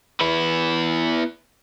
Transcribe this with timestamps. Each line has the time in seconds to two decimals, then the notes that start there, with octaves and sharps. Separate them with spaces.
0.20 B3 E4